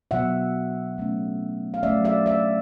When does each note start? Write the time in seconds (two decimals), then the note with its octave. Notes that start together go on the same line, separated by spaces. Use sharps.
0.11 B2 F#3 B3 E5 F#5
0.98 F#3 A3 C#4
1.74 F5
1.83 F#3 A3 C#4 D5 E5
2.05 D5 E5
2.26 D5 E5